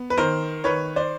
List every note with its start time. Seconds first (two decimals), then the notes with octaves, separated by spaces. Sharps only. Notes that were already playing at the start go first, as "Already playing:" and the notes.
Already playing: B3
0.10 B4
0.17 D#3 A#4 C5
0.64 D#3 B4 C#5
0.96 C5 D5